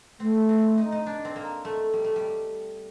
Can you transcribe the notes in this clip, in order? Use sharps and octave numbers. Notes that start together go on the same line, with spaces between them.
A3 C4
C4
D#4
D#4
D4
C4
A#3
A3
G3
A3
G3